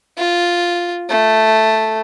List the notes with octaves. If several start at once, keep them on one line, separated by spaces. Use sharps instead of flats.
F4
A3